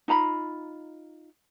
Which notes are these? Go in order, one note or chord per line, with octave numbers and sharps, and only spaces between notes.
D#4 F4 A#5 B5